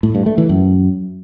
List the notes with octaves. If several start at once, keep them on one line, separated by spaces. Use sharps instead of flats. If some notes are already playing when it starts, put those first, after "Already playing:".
A2
G2
A3
E3
F#2